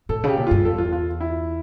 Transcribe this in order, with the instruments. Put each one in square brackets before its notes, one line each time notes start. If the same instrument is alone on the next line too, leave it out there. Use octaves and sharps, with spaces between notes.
[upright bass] A2 [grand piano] A4
[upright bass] C#3 [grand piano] G4
[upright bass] A#2
[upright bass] G2 [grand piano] F4
[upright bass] E2 [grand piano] A4
[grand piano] F4
F4
E4